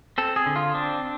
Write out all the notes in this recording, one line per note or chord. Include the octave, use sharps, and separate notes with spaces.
C4 A4
G#4
D3
F4
C4 D4